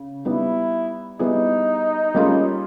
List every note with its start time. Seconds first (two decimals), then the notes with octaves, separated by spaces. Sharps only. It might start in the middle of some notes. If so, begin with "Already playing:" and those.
Already playing: C#3
0.25 G3 B3 D#4 E4
1.19 G3 B3 D#4 E4 G#4
2.15 G3 A#3 C#4 F4 G#4